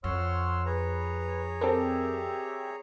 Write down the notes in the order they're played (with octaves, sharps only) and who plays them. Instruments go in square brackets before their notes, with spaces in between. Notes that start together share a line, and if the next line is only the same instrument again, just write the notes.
[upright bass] F2 [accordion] C#5 C6 E6 [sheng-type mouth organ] F#5 F6
[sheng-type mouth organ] G#4 C#5 A#5 [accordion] B4
[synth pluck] C4 A4 A#4 [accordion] G4 D5 E5